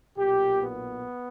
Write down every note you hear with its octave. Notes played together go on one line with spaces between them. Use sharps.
B1 A#2 G4
B3